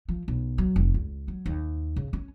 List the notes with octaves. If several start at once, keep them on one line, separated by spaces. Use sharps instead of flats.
F3
B1
F#3
F1
C#2
F#3
D#2
C#3
C#4